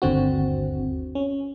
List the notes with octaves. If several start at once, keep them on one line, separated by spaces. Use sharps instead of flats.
G1 D#2 D3 C4 F#4
C#4